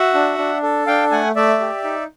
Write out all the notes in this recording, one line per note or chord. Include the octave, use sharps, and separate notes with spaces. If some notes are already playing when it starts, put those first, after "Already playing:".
Already playing: F#4 E5 F#5
D4
D4
A4
D4 F5 G5
A3 F#5 G#5
A3 D5 E5
G4
D#4